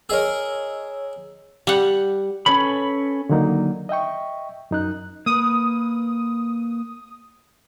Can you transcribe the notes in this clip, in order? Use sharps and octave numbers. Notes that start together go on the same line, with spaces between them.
G#4 A#4 C#5 D#5 E6
G3 F#5
C#4 A4 B4 C#5 B5
D3 D#3 F#3 A#3 D#4
D#5 E5 G5 C#6
F#2 D#4 F#6
A#3 B4 D#6